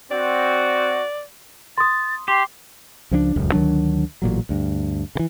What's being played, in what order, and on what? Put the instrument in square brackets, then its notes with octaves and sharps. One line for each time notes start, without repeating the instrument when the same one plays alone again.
[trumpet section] C4 F#4 [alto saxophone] D5
[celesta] C6 D#6 [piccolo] A6
[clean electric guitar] G4 [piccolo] C6
[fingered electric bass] C#2 F3 A3 D4
D#1 C#2 F#2
D2 D#3 F#3 D4
A1 A#2 F#3
D2 G2
C#3 E3